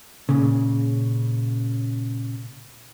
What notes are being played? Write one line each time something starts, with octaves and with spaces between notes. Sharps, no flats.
A#2 C#3